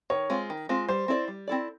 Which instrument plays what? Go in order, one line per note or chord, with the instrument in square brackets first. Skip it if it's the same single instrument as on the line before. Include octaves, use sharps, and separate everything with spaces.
[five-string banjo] D#3 [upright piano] C#5
[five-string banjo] G#3 C4 F4
D#3
G#3 C4 F4
[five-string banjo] G3 [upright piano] C5
[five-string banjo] C4 E4 A4 D5
G3
C4 E4 A4 D5